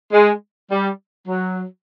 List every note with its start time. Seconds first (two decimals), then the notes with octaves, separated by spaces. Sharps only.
0.13 G#3
0.71 G3
1.28 F#3